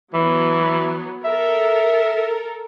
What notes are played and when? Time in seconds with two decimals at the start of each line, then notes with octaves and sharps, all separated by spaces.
0.14 E3 F#3 B3
1.24 A4 A#4 E5